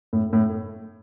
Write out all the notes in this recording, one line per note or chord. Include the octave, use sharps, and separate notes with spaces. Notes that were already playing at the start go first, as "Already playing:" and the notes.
A2
A2